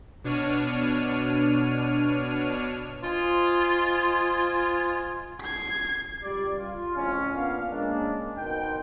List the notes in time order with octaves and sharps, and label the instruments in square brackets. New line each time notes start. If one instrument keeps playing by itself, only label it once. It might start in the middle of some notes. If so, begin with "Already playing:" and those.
[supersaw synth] B2 D4 C#5 F6 D#7
[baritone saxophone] F4 [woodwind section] C5 D#5 G#5
[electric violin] G#6 C7
[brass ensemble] C#2 G3 D5
F4
F2 A2 C#3 C#4
A#2 B3 D4 F5
G#3 A#3 C#4 D4
B2 D#3 D#4 A#4 C5 G5